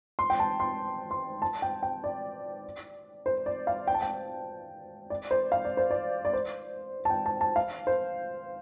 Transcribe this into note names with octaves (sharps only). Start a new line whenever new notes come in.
C6
G5
A5
C6
C6
A5
G5
G5
D5
C5
D5
F5
G5
A5
G5
D5
C5
F5
D5
C5
D5
D5
C5
A5
G5
A5
A5
F5
C5